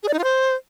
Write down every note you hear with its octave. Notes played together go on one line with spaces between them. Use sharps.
G#4
D5
D#4
F4
C5